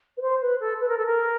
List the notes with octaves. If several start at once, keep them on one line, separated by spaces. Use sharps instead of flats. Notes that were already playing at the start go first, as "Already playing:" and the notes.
B4
C5
B4
A4
B4
A#4
A4
A#4